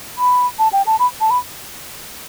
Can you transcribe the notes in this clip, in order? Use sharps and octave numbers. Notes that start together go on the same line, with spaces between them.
B5
A5
G5
A5
B5
A5
B5